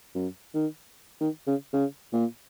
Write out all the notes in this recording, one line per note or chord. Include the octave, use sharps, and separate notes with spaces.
F#2
D#3
D#3
C#3
C#3
A#2